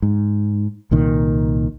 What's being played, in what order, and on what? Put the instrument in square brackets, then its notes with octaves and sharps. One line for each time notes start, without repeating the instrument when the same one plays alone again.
[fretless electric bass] G#2
C2 A#2 D#3